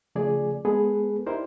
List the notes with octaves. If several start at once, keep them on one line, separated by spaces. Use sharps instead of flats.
C#3 F3 A3 G#4 D5 G#5
G#3 B3 G#4 A4 B4
D#4 E4 G4 A#4 C5 D5